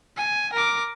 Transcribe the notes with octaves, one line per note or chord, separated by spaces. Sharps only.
G#5
A#4 D6